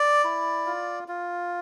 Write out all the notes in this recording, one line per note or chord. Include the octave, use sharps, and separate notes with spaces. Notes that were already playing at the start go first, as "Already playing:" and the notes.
Already playing: D5
E4
F4
F4